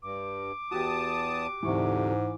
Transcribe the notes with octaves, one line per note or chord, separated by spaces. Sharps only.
G2 D6
E2 F#4 G4 A5 D#6
D2 G#2 C3 E3 C#6